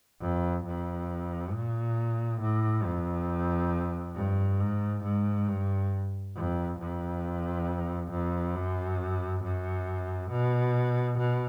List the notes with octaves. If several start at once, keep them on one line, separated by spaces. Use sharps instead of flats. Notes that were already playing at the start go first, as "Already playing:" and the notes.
F2
F2
A#2
A2
F2
G2
G#2
G#2
G2
F2
F2
F2
F#2
F#2
B2
B2